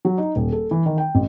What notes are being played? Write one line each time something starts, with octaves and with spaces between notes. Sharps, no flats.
F#3
D#4
D#1
A4
E3
D#3
G5
A1